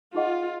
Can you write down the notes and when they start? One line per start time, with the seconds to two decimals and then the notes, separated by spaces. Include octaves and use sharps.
0.15 D#4 F4 G#4 D#5 F#5